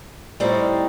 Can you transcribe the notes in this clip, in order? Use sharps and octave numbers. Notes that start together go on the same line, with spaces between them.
A2 G3 C4 D#4